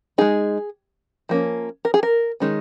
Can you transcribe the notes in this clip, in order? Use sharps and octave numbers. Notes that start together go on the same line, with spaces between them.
G#3 D#4 G#4
F3 A#3 C#4
A#4
G#4
A#4
D#3 G#3 C#4